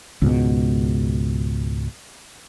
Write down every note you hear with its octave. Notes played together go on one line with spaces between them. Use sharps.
C#2 G#2 B2